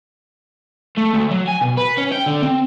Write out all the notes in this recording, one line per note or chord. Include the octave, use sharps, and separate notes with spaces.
A3
D2
F#3
G#5
B2
B4
C#4
G5
D3
C4